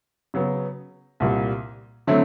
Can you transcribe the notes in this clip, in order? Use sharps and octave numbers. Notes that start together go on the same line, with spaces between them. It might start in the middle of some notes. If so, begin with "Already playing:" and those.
C#3 F#3 B3
C2 A#2 G3
D3 F#3 A3 C4 E4